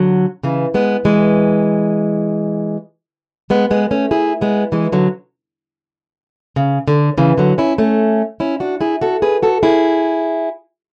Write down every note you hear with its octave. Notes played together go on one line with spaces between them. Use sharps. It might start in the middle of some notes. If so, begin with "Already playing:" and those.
Already playing: D3 F#3
C#3 E3
G#3 B3
E3 G#3
G#3 B3
G#3 B3
A3 C#4
E4 G#4
G#3 B3
E3 G#3
D3 F#3
C#3
D3
C#3 E3
D3 F#3
C#4 E4
A3 C#4
C#4 E4
D4 F#4
E4 G#4
F#4 A4
G#4 B4
F#4 A4
E4 G#4